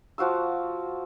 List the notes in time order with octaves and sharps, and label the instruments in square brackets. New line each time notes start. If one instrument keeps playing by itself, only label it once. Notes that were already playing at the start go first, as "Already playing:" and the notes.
[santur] F3 F#4 F5 E6